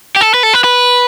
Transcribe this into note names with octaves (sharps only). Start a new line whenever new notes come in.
G4
A4
B4
A4
B4
B4